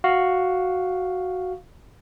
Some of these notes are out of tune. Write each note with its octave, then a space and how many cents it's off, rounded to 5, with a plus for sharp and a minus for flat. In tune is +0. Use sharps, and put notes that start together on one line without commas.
F#4 +0 F5 +5